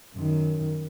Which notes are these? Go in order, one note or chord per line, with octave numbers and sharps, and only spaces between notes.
F#2 D#3